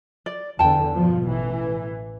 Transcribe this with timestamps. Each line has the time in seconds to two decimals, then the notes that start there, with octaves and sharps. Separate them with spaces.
0.26 D5
0.59 E2 D3 G5 A5
0.94 G2 B2 F3
1.25 A1 E3